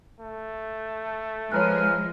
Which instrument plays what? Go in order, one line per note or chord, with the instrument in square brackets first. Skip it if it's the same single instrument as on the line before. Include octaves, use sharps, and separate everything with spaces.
[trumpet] A3
[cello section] F3 G#3 [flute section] B4 G#5 F6 [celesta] C#5 A#5 F#6